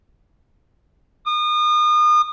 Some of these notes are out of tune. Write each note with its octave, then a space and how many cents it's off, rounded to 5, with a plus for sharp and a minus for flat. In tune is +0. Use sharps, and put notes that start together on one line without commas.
D#6 -35